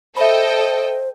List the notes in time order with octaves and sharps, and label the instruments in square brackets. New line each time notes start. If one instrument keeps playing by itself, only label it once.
[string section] A4 D#5 G5 [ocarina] C5 [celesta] E5 B5